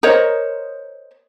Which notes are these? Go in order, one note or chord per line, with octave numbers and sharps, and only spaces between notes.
A#4 C5 C#5 D#5